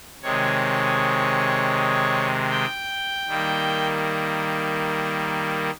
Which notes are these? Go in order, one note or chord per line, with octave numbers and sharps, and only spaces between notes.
C3 D#3 G#3 C#5
G5
D#3 G3 A#3